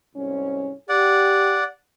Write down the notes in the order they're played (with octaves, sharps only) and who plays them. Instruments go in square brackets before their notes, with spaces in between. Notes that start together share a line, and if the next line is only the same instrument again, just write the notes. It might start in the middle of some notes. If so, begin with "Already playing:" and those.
[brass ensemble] C2 G#2 C#4
[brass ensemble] G4 [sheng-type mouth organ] D5 F#5